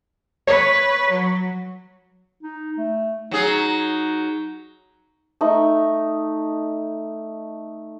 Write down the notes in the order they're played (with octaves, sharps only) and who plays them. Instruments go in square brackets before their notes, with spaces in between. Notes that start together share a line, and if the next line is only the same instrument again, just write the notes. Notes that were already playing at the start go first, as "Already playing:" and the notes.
[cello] B4 [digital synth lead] C#5
[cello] F#3
[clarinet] D#4
A3
[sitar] F#3 G#4 [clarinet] D#4
[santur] A3 D#4